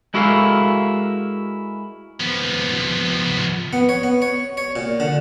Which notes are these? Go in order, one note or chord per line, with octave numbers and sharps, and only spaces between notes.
G#3 E4 F#4 A4 A#4 F5
F3 B3
B3
C#5
B3
C#5
C#5
A#2
D3